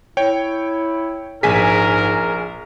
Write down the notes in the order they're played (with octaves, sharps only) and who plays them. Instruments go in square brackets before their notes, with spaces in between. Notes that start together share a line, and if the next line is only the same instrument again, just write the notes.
[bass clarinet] E4 [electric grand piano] C#5 G5
[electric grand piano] A#1 G#5 B6 [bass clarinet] G#2 [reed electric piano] G#4 [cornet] A#4